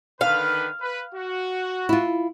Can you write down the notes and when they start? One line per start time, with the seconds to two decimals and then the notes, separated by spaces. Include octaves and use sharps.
0.21 D3 D#3 B4 F5
0.81 B4
1.15 F#4
1.89 E4 F4